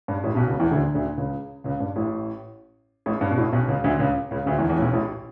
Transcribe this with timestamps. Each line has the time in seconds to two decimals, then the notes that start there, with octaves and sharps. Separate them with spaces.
0.08 G2
0.23 A1 A2
0.35 B1 B2
0.47 C#2 C#3
0.59 E2 E3
0.71 D2 D3
0.94 D2 D3
1.18 C#2 C#3
1.64 C#2 C#3
1.80 G2
1.96 A1 A2
3.06 A1 A2
3.21 G2
3.31 B2
3.37 A1 A2
3.52 B1 B2
3.68 C#2 C#3
3.84 D2 D3
3.99 C#2 C#3
4.31 C#2 C#3
4.46 D2 D3
4.58 E2 E3
4.69 E2 E3
4.76 A2
4.82 B1 B2
4.93 A1 A2